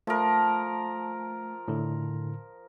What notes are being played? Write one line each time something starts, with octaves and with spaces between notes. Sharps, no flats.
F3 A3 A#4
A2 D3